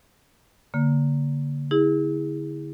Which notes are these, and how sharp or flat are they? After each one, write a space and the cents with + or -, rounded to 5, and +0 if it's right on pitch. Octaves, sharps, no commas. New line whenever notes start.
D3 -35 A#3 +0
E4 -30 G#4 -25